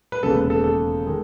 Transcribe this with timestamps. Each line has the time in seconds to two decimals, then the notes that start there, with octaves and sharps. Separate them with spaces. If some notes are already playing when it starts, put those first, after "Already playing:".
0.12 B4
0.23 E1 D#2 C#3 G#3 A4
0.37 B4
0.50 A4
0.64 A4
1.07 D#3 G#3